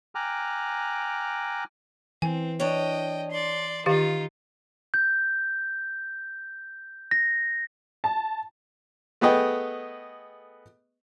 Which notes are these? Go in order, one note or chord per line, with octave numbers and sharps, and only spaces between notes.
G5 G#5 A#5 D6 F6 F#6
E3 C4 G#5
D4 C#5 D#5 G5
D5 C6
D#3 D#4 F4 G4 F5
G6
A#6
A5
A3 B3 G#4 B4 D#5 G5